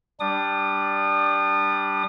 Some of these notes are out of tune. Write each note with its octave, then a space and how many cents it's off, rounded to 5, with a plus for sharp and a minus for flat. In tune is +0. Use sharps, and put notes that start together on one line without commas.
G3 +0 D4 +0 D#6 -35